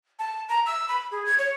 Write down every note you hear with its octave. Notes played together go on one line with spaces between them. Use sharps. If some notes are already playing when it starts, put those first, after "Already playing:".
A5
A#5
E6
B5
G#4
G#6
C#5